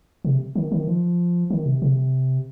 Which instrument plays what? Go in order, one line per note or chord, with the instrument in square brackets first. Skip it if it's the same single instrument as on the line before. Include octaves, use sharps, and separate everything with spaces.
[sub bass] C3
D#3
D#3
F3
D#3
C3
C3